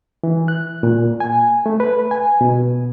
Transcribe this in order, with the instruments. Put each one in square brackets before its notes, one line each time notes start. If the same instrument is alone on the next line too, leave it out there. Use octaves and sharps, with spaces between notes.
[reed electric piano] E3
F#6
A#2
G#5
A3
B4
G#5
B2